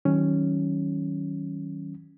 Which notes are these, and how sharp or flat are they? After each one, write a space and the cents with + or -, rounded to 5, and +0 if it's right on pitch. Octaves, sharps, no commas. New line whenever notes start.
D#3 +30 F#3 +35 C#4 +0